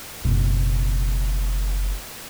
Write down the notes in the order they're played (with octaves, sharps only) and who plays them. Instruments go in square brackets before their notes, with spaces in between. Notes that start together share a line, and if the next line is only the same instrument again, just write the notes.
[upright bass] F#1 B2